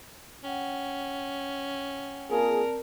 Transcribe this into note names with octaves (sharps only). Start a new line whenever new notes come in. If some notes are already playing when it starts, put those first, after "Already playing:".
C#4 F#5 G5
A#3 C4 F4 G#4 A#4 D5 A5